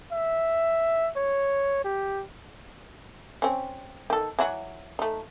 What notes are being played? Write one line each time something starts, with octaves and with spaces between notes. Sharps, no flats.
E5
C#5
G4
C4 C#4
D#3 A4
E3 F#3 F#4
A3 D#4